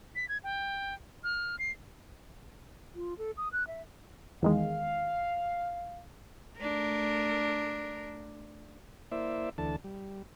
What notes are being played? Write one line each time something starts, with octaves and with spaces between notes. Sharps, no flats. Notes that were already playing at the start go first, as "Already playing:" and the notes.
B6
G#6
G5
F6
C7
F4
A4
D#6
F#6
E5
E2 D#3 G#3 F5
A3 D4 A#4
A#3 E4 C5 D5 E5
D2 E3 D4 A4 A5
G3